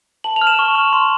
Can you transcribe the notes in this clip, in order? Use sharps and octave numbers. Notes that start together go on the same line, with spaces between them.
A5 F#7
F7
F6
E7
C#6
F6
C6